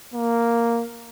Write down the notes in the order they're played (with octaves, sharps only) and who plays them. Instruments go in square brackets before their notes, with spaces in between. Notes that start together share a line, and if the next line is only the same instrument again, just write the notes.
[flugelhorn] A#3